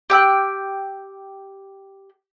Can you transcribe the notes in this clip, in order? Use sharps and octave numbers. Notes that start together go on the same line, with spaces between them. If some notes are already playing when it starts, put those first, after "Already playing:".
G4 G5 E6 F#6